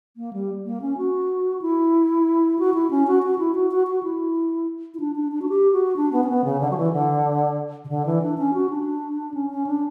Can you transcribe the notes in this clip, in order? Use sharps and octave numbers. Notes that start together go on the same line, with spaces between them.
A#3
G3
A#3
C#4
F#4
E4
F#4
E4
C#4
F#4
F#4
E4
F#4
F#4
F#4
E4
E4
D4
D4
D4
F#4
G4
F#4
D4
B3
C#4
B3
C#3
D3
F#3
E3
D3
C#3
D3
E3
D4
C#4
F#4
D4
C#4
C#4
D4